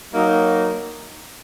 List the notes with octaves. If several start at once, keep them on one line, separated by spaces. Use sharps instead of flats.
F#3 A#3 D#4